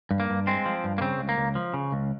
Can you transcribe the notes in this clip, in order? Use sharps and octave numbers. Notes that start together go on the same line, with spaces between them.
G2
A#3
G2
G#3 C4
F3
G2
A#3
C#3 C4
C#2
A#3
C#2
F3
C#3
C#2